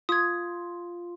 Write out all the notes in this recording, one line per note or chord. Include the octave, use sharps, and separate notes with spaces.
F4 D#6 G#6